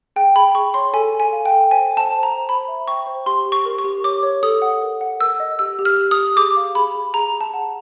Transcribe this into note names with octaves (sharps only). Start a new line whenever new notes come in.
G#4 G5
G#4 B5
G#4 C#6
C#5 C6
A4 G#5
A4
G#5
F5
G5
A4
C5 G#5
C5
A5
C5
A#5
C5
C5 B5
E5
G5 C#6
C5
G4 C6
G4
C#6
A#4
C#6
G4
C#5 D6
C#5
A4 D#6
F#5
A#4
F#5
A#4 E6
D#5
G4 E6
G4
F6
G4
D#6
G4
G#4 D6
F5
G#4 B5
G#4
G#4 A#5
G#4
A5
F#5